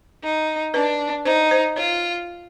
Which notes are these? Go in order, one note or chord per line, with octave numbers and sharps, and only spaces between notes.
D#4
D4 B4
D#4 C5
C5
F4 C#5